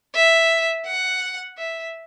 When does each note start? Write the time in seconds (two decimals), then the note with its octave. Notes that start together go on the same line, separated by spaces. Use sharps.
0.15 E5
0.86 F#5
1.58 E5